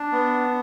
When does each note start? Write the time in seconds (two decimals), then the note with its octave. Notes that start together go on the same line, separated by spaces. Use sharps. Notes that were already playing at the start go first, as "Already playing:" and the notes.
Already playing: D4
0.12 B3